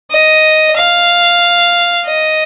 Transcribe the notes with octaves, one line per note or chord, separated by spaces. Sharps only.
D#5
F5
D#5